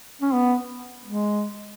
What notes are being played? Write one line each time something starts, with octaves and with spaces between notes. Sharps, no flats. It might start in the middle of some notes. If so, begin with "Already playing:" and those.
C#4
B3
G#3